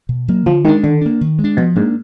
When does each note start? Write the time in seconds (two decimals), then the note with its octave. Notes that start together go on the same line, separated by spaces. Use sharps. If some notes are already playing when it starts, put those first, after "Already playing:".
0.09 B2
0.28 F#3 A#3
0.46 D3 F3
0.65 D#3 G#3
0.68 D4
0.83 D3 D#3
1.01 A#3 D4
1.21 D#3
1.39 G#3
1.44 D4
1.57 B2 F3
1.76 G#2 A#3 D4